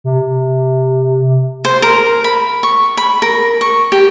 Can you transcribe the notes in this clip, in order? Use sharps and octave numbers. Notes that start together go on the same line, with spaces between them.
C3
C5
A#4
B5
C#6
B5
A#4
C#6
G4